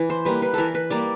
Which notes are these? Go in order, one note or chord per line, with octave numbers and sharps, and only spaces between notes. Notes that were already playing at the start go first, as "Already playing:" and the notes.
Already playing: E3
C5
G3 A#3 B4
B4
E3 A4 A#4
B4
G3 A#3 D5